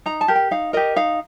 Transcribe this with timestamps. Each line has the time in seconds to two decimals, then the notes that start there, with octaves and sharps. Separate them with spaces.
0.06 D#4 A#5
0.21 A5
0.28 G4 A#4
0.36 G5
0.51 D#4 F5
0.73 G4 A#4 D#5
0.96 D#4 F5